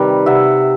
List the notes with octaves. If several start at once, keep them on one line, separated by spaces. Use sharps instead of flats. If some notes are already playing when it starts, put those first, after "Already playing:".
Already playing: C3 D#3 G3 B4
C3 E5 F#5